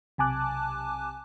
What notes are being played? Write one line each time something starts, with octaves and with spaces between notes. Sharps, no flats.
B1 C3 G#5 A5 D6 F#6